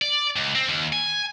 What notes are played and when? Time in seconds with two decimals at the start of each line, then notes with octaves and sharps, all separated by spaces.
0.02 D5
0.36 C#2
0.55 C4
0.69 D#2
0.93 G#5